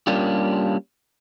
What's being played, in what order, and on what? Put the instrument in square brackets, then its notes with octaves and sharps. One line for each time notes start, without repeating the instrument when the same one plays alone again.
[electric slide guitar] G3 A#3 C#4 D4 F4 G4